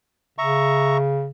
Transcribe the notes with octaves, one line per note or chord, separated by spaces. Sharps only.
C#3 E5 A#5 C#6